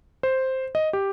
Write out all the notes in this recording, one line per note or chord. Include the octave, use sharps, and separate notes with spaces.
C5
D#5
G4